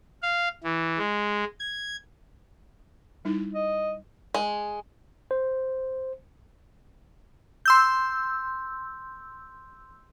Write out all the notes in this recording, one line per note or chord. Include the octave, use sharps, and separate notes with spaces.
F5
E3
G#3
G#6
G3 D#4 E4
D#5
G#3
C5
C6 E6 G6